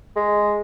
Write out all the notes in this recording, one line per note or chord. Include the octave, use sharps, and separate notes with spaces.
G#3